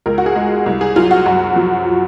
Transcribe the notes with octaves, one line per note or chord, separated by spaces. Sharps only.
C#2 A#4
F#4
G#4
G#3
C2
G#4
F#3 F4
F#4
F#2
F3